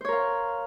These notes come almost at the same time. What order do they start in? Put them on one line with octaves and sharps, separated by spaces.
C5 C#5 A#4 F5